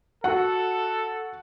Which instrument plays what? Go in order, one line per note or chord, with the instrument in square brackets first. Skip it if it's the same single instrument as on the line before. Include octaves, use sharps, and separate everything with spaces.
[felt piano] F#4 F#5 [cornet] A4